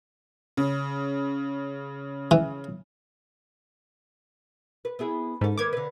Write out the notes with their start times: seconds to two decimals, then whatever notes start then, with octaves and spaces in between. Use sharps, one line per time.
0.57 C#3
2.31 E3
4.85 B4
4.99 B3 E4 G#4
5.41 G#2 C#4 A4
5.58 D#3 A#3 B4 D6 G#6
5.73 D3 B4